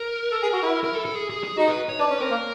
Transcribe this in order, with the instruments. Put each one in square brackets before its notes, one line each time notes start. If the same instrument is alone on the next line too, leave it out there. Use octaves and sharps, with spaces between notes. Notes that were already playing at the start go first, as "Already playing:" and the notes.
Already playing: [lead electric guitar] A#4
[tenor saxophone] A4
G#4
F#4
E4
[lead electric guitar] A#4
A4
A4
G#4
G#4
G#4
[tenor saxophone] D#4 [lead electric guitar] F#4
[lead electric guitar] B4
C#5
[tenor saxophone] D4 [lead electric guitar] B4
[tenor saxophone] C#4
[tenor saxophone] C4 [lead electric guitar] A#4
[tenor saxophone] A#3